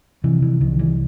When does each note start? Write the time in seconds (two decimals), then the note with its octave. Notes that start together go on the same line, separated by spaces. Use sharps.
0.24 C3 E3
0.42 E3
0.61 C2 D#3
0.79 E3